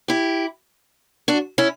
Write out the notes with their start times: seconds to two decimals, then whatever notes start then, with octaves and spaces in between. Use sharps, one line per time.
0.08 E4 G4
1.28 D4 F#4
1.58 C#4 E4